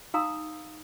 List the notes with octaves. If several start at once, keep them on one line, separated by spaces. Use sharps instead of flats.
D#4 F5 A#5 C6 D#6 E6